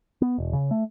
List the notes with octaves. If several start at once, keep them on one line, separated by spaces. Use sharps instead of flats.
B3
E1
C#3
A3